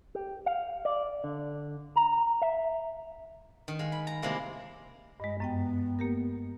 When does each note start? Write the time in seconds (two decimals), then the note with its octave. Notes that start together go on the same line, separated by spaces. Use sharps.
0.15 G4
0.46 F5
0.85 D5
1.24 D3
1.96 A#5
2.42 E5
3.68 D#3
3.79 G#3 F5
3.92 B5
4.07 A#5
4.22 C3 G#3 A#3 E4
5.20 G2 G#3 D#5
5.40 F#2 B3 D#5 G5
5.99 A#3 G4 A#4